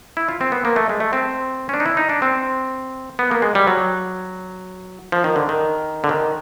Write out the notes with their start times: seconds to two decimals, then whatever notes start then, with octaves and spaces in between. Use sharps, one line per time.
0.17 E4
0.29 F4
0.41 C4
0.52 B3
0.65 A#3
0.76 A3
0.89 G#3
1.00 A3
1.13 C4
1.69 C#4
1.74 D4
1.80 D#4
1.86 E4
1.97 D#4
2.09 D4
2.22 C4
3.19 B3
3.31 A#3
3.42 G#3
3.55 G3
3.67 F#3
5.12 F3
5.24 D#3
5.36 D3
5.49 D#3
6.04 D3
6.09 D#3